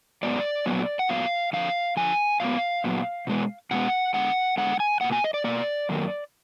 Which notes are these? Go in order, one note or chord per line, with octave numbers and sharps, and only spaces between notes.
G#2 F#3 B3 D5
A#2 F#3 B3
F#5
A#2 F#3 B3 F5
F2 D3 F3 F5
F2 D3 F3 G#5
A#2 F#3 B3 F5
A#2 F#3 B3
B2 G#3 B3
B2 G#3 B3 F#5
D3 G#3 B3 F#5
D3 G#3 B3 F#5
G#5
B2 A#3 F#5
G#5
D#5
D5
B2 A#3 D5
F#2 D#3 A#3